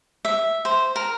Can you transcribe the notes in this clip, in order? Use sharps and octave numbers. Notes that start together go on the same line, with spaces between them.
E5
C5
A#4